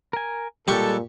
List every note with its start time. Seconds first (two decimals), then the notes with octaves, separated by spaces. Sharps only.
0.13 A#4 G#5
0.68 A#2 G3 G#3 G4 A4 C#6 F#6